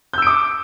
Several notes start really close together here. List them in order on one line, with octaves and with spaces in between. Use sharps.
G6 E6 D7 D6